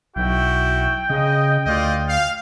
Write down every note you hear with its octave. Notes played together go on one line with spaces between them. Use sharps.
B1 E4 F#4 G5
C#3 D#5
D2 F4 D5 D#5
F5